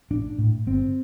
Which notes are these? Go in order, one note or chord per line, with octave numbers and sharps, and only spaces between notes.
A1 D4
A2
G1 C4